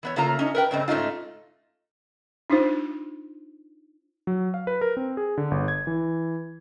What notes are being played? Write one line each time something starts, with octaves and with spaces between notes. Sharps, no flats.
E3 B3 C#5
C#3 A3 A#3 F4 A#5
C#4 D#4
A#4 B4 G5
G2 C#3 A3 C4 D#5
G#2 A3 C#4 D#4 F4
D4 D#4 F4 C5
F#3
F5
B4
A#4
C4
G#4
D3
G1
G#6
E3